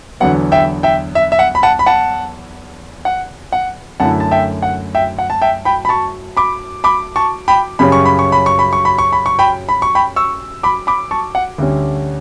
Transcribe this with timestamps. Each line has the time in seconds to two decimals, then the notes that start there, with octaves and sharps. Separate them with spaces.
0.20 E2 D3 F#3 B3 F#5
0.52 E5 G5
0.83 E5 G5
1.15 E5
1.32 E5
1.39 F#5
1.55 B5
1.63 F#5 A5
1.79 B5
1.86 F#5 A5
3.05 F#5
3.52 F#5
4.00 F#2 D3 A3 E4 F#5 A5
4.20 A5
4.31 E5 G5
4.62 F#5
4.95 E5 G5
5.19 F#5
5.30 A5
5.42 E5 G5
5.65 G5 B5
5.85 B5
5.89 A5 C#6
6.37 B5 D6
6.84 B5 D6
7.16 A5 C#6
7.48 G5 B5
7.79 F#2 C#3 G3 C#4 B5
7.92 C#6
8.05 B5
8.19 C#6
8.32 B5
8.46 C#6
8.59 B5
8.73 C#6
8.85 B5
8.98 C#6
9.13 B5
9.26 C#6
9.39 G5 B5
9.69 B5
9.82 C#6
9.95 G5 B5
10.16 C#6 E6
10.63 B5 D6
10.87 B5 D6
11.11 A5 C#6
11.35 F#5
11.58 D2 D3 G3 C#4